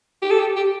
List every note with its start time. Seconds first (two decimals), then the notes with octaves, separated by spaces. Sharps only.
0.23 G4
0.31 A4
0.39 G4
0.56 G4